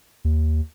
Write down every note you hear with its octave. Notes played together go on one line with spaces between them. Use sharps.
D#2